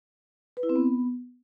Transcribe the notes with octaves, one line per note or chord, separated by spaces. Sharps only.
B4
E4
C4
B3